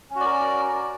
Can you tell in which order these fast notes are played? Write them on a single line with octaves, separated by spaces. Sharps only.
C#4 F#4 D5 A#4